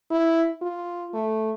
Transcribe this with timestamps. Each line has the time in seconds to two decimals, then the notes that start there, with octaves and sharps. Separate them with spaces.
0.11 E4
0.62 F4
1.14 A3